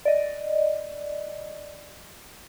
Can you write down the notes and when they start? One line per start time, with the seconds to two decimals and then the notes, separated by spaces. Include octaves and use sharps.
0.05 D5 D#5